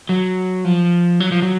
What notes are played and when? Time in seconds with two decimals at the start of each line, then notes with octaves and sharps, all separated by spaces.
0.09 F#3
0.65 F3
1.20 F#3
1.31 F3
1.42 F#3